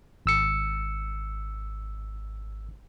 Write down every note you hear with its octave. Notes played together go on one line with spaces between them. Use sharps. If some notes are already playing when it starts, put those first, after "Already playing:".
G#1 E6 C#7